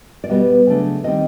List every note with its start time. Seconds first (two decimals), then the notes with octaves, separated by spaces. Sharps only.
0.24 D5
0.29 B2 G3 B3 D#5
0.67 C#3 F#3 A3 D4
1.04 D#3 G3 C4 D#5